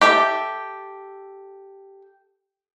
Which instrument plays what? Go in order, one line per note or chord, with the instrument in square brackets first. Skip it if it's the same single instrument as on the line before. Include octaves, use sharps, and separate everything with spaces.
[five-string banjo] G4 A4 E5